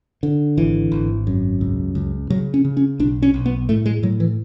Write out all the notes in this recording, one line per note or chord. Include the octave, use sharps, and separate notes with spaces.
D3
G#1 E3
G#1
F#2
C#2
C#2
C#3 F#3
C#4
C#3
C#4
B1 D4
C#4
B1
B3
A2 A3
G#3
A2 F#3
E3